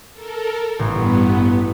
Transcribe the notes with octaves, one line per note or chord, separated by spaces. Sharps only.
A4 A#4
A1 G2 B3